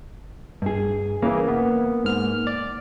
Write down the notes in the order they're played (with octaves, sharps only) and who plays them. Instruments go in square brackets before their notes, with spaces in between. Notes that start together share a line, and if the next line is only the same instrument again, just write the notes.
[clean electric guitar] G2 G#4
[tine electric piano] C#3 E3 [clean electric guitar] A#3
[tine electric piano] B3
G#2 F6
D5